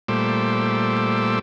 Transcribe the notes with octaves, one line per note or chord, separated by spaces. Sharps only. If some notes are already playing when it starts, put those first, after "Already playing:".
A#2 G3 A3 C5 D6 E6